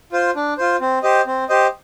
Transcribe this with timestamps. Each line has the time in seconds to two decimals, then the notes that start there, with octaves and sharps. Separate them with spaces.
0.12 F4 C5
0.36 D4
0.58 F4 C5
0.81 C4
1.03 G4 C5 D#5
1.26 C4
1.49 G4 C5 D#5